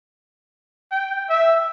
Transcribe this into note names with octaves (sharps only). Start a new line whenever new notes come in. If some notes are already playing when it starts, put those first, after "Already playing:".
G5
E5